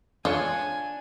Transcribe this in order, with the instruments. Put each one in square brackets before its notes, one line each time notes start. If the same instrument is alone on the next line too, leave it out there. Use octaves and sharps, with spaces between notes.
[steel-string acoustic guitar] D4 [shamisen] F4 C#5 [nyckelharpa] G#5